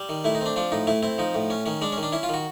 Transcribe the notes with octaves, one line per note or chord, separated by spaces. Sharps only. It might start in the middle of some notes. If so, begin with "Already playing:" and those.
Already playing: G3
D#3
A3 E4
D#4
C4 D4
F3 D4
A2 D#4
A3 E4
C4 E4
F3 D#4
A2
C#4
D#3 C#4
G#3 D4
C#4
D#3
D4
C#4 E4
F4
D#3 F#4